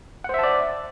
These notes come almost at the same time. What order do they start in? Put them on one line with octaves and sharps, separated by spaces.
F#5 C5 E5 A5 D5